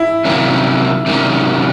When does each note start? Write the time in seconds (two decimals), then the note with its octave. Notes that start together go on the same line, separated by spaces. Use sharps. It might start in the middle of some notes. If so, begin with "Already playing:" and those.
Already playing: E4
0.25 C3 D#3 F#3 A#3 C#4
1.06 C3 D#3 F#3 A#3 C#4